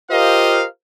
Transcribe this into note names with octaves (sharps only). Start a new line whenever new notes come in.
F4 G4 A#4 C5 D#5 F5